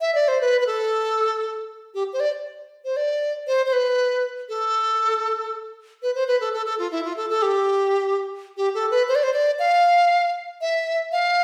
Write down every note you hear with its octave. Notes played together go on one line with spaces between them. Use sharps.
E5
D5
C5
B4
B4
A4
G4
C5
D5
C5
D5
C5
C5
B4
A4
B4
C5
B4
A4
A4
A4
F4
E4
F4
A4
A4
G4
G4
A4
B4
C5
D5
C5
D5
F5
E5
F5